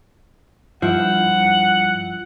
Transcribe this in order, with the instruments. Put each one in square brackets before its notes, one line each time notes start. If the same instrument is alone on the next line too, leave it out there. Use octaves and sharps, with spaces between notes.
[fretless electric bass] G2 [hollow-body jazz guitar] F3 E4 [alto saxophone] F#5